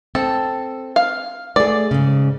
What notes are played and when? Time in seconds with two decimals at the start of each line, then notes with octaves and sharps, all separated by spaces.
0.15 C4 A4
0.96 F5
1.56 A3 G#4 D5
1.91 G#2 C#3